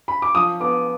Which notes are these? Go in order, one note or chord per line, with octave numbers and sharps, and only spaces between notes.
B5
D6
F3 D#6
B3 D6